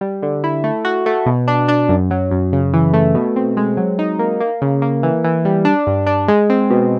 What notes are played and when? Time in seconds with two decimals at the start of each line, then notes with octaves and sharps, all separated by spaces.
0.01 G3
0.23 D3
0.44 E4
0.64 A3
0.85 F#4
1.06 A3
1.26 B2
1.48 D4
1.68 D4
1.89 F#2
2.11 F#3
2.31 F#2
2.53 C#3
2.73 E3
2.93 A3
3.15 B2
3.36 C4
3.57 G#3
3.77 F#3
3.99 D#4
4.19 A#3
4.40 A#3
4.62 C#3
4.82 A#3
5.03 E3
5.24 E3
5.45 G3
5.65 D4
5.87 G2
6.07 D4
6.28 G#3
6.50 C4
6.70 B2